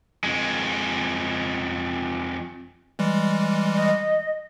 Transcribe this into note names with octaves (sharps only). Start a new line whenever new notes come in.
F2 G#3
E3 G3 G#3
D#5